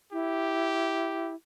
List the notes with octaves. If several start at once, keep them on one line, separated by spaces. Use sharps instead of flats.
E4 G4